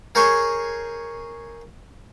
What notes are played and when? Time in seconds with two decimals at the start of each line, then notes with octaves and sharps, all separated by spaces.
0.15 G#4 A#4 C5 C#5 G#5 C#6